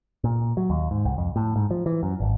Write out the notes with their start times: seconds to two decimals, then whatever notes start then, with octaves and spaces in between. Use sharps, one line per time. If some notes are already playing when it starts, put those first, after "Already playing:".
0.24 A#2
0.57 F#3
0.70 D#2
0.91 G#2
1.05 C2
1.18 F2
1.36 A2
1.56 G#2
1.71 F3
1.86 E3
2.03 F#2
2.20 G#1